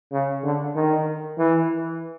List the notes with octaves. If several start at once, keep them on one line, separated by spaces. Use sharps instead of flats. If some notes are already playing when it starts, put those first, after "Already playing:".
C#3
D3
D#3
E3